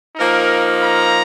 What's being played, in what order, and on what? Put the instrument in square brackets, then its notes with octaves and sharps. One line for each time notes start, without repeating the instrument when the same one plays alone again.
[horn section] F3 A#3 D#4 A#4
A#5